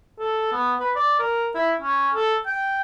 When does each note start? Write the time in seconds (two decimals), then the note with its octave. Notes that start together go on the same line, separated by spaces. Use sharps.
0.19 A4
0.52 B3
0.80 B4
0.95 D5
1.19 A#4
1.55 E4
1.81 C#4
2.14 A4
2.46 G5